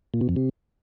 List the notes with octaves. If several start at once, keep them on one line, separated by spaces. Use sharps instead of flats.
A#2
B2
F2
C3